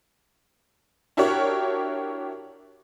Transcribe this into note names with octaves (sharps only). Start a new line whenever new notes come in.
D4 E4 F#4 G4 A#4 C#5